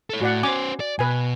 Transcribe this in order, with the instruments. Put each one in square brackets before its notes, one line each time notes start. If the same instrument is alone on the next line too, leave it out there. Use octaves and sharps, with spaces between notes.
[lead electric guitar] A4 C#5
[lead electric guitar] A2 [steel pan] F#4 D5 F#5
[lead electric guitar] C#4 C5 [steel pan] G#5 D6
[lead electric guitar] D5
[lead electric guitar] B2 [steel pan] B4 G#5